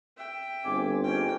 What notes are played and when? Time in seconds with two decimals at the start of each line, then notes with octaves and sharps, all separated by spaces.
0.17 E5 G5
0.64 G1 G#2 C4 G#5 D6
1.04 G#2 A#3 C#4 G5